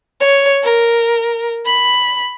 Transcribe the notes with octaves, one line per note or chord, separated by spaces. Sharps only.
C#5
A#4
B5